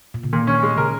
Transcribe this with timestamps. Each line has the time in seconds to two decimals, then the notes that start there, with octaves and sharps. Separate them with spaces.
0.14 A#2
0.23 C#3
0.33 A#2 D#3
0.47 C#4
0.63 G#3
0.77 C#3 A#4